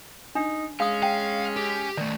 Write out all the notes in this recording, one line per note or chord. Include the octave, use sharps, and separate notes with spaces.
D4 D#4
G#3 C#4 F5 D#6
F5 G5
G4
D#3 A3 D5